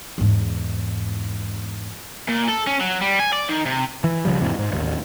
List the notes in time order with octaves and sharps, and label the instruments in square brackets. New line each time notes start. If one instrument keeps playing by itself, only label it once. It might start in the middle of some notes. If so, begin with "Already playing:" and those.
[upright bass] E2 G#2
[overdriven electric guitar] A#2
A4
C#4
F#3
G3
G#5
D5
D#3
C3
[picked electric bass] E3
C#2 C#3 F3 G3
E2 G#2 C3 E3
G#2
A1 D#2